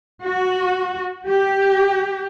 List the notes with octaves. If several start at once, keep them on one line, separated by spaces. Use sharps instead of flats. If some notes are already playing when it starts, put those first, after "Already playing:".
F#4
G4